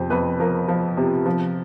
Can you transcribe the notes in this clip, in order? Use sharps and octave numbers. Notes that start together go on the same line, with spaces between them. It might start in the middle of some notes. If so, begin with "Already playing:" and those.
Already playing: F2 C3 C5
F2 B4
F3 A#4
F3
C3
F3